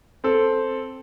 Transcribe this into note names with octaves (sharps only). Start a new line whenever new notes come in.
C4 A4